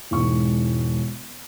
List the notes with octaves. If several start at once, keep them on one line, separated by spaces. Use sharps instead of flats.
E1 G#2 C#6